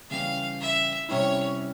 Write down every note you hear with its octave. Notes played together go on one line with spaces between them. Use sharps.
C#3 E3 G3 C#4 F5
E5
C3 G3 C#4 E4 C#5